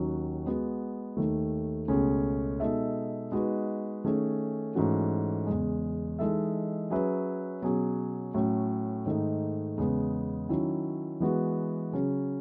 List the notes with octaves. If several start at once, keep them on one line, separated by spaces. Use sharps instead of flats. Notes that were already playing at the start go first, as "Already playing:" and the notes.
Already playing: D#2 D#3 F#3 C#4 F#4
G#3 B3 F#4
D#2 D#3 A3
C#2 B2 A3 C#4 G#4
B2 G#3 D#4 A4 E5
G#3 B3 D#4 F#4 B4
D#3 A3 C#4 G#4
G#2 E3 A3 C#4 F#4
E2 C#3 G#3
E3 G#3 D#4 A4 E5
F#3 C#4 G#4 B4 E5
B2 F#3 C#4 G#4
A2 F#3 A3 C#4
G#2 D#3 A3 D#4
E2 C#3 G#3 B3
D#3 F#3 C#4 E4
E3 G#3 B3 F#4 B4
C#3 F#3 C#4 G#4